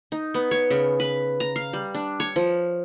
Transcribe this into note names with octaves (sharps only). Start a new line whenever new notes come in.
D#4
B3
C#5
C#3
B4
A#5
F5
G3
D4
C#5
F3